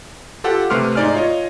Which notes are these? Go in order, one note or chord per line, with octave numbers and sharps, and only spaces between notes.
F4 G4 A4 F#5
C3 A3 B4 C6 D6 F6
G#2 D#4 D5 G#5 F6
F4 C#5 D#5